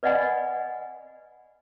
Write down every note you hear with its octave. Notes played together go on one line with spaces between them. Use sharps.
B4 D5 D#5 F#5 G#5 B5